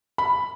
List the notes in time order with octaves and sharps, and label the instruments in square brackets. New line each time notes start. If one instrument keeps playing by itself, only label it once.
[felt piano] B5